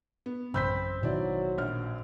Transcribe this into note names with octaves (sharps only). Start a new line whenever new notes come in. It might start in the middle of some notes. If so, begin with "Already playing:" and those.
B3
A1 F#2 C#3 C4 B5 G6 B6
A1 B2 D#3 F#3 E4 D5
A#1 F6